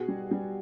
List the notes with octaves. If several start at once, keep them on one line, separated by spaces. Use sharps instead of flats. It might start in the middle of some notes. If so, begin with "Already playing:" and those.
Already playing: B2 F#4 G#4
G3
G3